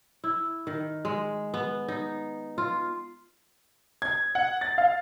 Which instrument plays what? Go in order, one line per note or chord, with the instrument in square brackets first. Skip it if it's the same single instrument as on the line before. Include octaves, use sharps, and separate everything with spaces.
[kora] E4
D#3
G#3
B3
D#4
F4
[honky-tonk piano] G#6
F#5
A6
F5